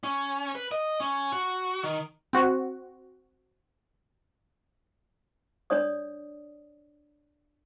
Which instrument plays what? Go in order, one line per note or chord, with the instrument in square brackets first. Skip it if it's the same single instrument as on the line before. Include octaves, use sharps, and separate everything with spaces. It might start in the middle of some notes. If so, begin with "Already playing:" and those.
[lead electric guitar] C#4
B4
D#5
C#4
F#4
D#3
[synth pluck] C4 F#4
[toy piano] D4 C#5 D5 D#6